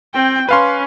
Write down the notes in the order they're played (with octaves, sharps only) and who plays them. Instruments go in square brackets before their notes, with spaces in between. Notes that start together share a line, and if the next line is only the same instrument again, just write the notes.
[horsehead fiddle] C4 G5
[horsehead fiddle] C#4 [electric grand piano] B4 F5 C6